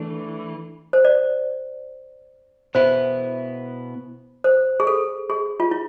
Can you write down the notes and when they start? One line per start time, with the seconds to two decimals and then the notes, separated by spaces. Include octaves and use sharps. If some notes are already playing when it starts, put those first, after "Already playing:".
Already playing: E3 A3 D4
0.93 C5
1.05 D5
2.75 B2 B3 E4 C5
4.44 C5
4.80 G#4
4.87 A4
5.30 G#4
5.60 F4
5.71 E4